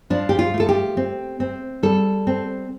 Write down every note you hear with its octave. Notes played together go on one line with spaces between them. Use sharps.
F3 D4
G4
F4
A3
A4
G4
C4
C4
G3 A4
C4